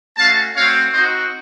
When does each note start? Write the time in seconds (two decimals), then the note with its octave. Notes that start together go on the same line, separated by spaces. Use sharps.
0.17 A3 C#4 F#4 F5 A5
0.55 A3 C4 F#4 C#5 F5
0.93 C4 D#4 F#4 C5 D#5